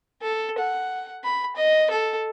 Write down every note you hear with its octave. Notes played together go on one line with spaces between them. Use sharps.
A4
F#5
B5
D#5
A4